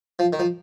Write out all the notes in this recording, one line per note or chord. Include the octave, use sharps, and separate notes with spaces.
F3
D#3
F3